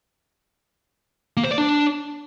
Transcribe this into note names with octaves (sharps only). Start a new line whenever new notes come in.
A#3
C5
D5
D4